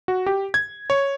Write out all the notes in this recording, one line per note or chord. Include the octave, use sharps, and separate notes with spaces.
F#4
G4
G#6
C#5